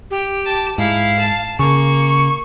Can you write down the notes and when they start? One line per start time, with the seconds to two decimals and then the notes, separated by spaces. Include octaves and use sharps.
0.11 G4
0.45 A5
0.78 G#2 E4 F5
1.19 A5
1.59 C#3 A#3 C#6